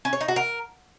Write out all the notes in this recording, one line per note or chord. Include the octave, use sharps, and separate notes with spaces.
C#4
C#5
D#4
F#4
A#4